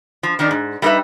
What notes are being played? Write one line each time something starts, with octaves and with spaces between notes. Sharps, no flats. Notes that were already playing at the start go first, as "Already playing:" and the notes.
F3
D#3 F3 D4 D#4
G#2
G3 A3 D#4 A#4 B4 E5